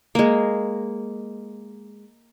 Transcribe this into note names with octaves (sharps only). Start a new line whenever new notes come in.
G#3 A#3